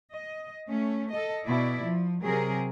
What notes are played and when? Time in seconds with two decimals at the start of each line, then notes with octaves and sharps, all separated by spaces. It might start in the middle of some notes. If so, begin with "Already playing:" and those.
0.14 D#5
0.68 A3 C#4
1.11 A4 D#5
1.45 B2 E4 D5
1.86 F3
2.23 C3 F#3 G#4 A#4